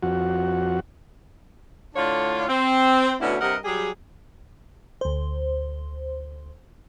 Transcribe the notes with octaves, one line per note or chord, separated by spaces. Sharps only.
F2 F#4
A2 D3 D4 F4 C#5 F5
C4
D2 B2 D3 C#4 E4
G2 C3 A#4 D#5 F#5
F#3 G3 G4 G#4
D2 C5